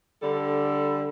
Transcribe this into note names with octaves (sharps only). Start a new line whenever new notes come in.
D3 G3 A4